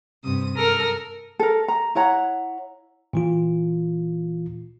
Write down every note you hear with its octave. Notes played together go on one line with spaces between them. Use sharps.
G2 C3 D#6
A4 A#4 D#6 F6
A4 A#4
A#5
E4 C#5 F#5 A#5
A#2 E3 F4